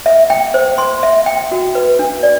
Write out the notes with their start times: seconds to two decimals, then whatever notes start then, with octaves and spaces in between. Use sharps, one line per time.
0.06 E5
0.30 G5
0.54 C5
0.78 C6
1.03 E5
1.26 G5
1.52 F#4
1.75 B4
1.99 D4
2.23 D5